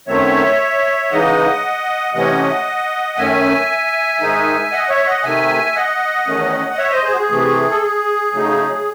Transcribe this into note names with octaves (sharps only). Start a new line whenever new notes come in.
F#2 D#3 F#3 A3 C4 C#5 E5
C#3 E3 G#3 D#4 D#5 F#5
C3 E3 A3 C#4 D#5 F#5
F#2 D#3 A3 C#4 E5 G#5
G#2 D#3 G#3 D#4
D#5 F#5
C#5 E5
D#5 F#5
C3 D#3 A3 E5 G#5
D#5 F#5
E2 D#3 A3 C#4
D#5
C#5 E5
C5 D#5
G#4 C5
F#4
G#4
C3 E3 A3
A4
G#4
C#3 F#3 A3 D#4